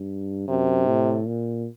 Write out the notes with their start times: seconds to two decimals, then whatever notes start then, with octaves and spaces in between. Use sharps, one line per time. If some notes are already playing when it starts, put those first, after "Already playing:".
Already playing: G2
0.49 F#2 C3
0.87 A2
1.27 A#2